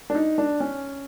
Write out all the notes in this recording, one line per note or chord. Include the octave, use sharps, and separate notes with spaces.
D4
D#4
D4
C#4